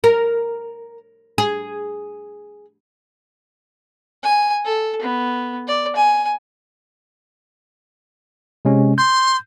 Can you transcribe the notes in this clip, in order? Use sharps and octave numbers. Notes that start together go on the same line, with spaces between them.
A#4
G#4
G#5
A4
B3
D5
G#5
C3 G#3 C#4
C6 G6